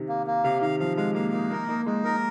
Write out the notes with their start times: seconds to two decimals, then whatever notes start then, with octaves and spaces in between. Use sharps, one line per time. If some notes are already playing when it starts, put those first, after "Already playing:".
Already playing: C3 D#3
0.09 A#3
0.27 A#3
0.44 C3 F5
0.61 D#3 F5
0.80 F3 F5
0.97 G#3 F5
1.15 A#3 F5
1.33 A#3 D#4
1.50 A#3 A#4
1.68 A#3 D#4
1.86 G#3 D#4
2.04 G#3 A#4